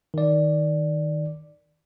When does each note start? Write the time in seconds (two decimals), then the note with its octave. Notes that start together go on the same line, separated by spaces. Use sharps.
0.14 D#3 D5